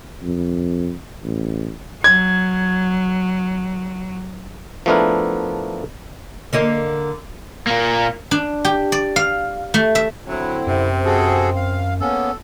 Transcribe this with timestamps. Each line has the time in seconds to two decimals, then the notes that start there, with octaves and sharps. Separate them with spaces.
0.23 F2
1.24 A1
2.04 F#3 G#6
4.86 F3 A3 B3 D4 E4 A#4
6.53 D3 A#3 D#5
7.67 A#2 A#3
8.31 D4
8.65 G4
8.92 D5
9.16 F5
9.74 A3
9.95 E5
10.28 D3 F#3 C4 E4
10.67 F#2 C3
11.05 F#4 G#4 A4
11.56 F5
12.01 A#3 B3 C#4 A4